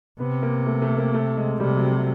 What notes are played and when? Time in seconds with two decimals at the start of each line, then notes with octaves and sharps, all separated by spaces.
0.20 C3 B3
0.43 A#3
0.66 A3
0.82 A3
0.98 A#3
1.14 A3
1.37 G#3
1.60 C3 G3
1.76 F#3
1.91 F#3